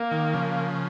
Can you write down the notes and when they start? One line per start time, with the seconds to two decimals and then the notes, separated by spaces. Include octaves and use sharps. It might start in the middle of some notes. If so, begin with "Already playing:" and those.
Already playing: A#3
0.11 D#3
0.33 C#3 F3